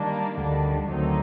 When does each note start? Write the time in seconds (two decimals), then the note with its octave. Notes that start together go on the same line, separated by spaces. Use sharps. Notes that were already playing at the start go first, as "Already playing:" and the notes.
Already playing: D#3 G3 A#3 D4
0.37 D2 D3 D#3 G3 D4
0.88 D2 D3 D#3 F#3 A3 C4 D#4